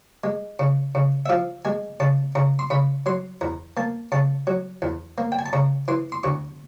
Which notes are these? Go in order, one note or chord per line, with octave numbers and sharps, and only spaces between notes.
G#3
C#3
C#3
E5
F3 F5
G#3 G#5
C#3 A5
C#3 A#5
C6
C#3 B5
F#3 C6
E2 A#5
A#3 A5
C#3 A5
F#3
E2
A#3
G5
G#5
A5
C#3 A#5
E3 C6
C6
D2 C#6